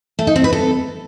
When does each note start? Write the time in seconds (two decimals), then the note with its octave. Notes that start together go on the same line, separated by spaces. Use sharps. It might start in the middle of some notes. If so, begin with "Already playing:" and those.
0.19 A3
0.27 D#4
0.36 C4
0.44 B4
0.53 A4